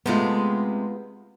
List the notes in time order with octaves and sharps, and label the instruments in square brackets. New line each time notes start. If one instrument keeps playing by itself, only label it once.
[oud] C3 G#3 A3 [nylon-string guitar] B3 F4